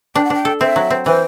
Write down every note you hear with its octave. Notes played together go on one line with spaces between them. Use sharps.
D4 G5
F#5
D4 G5
A4
C4 E5
F#3
C4
E3 C5